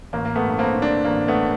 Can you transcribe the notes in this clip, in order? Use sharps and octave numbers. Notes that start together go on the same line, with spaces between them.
A1 A#3
A#3
A3 B3
G2
A#3 C4
D3
C4 D4
A1 A#3
A3 B3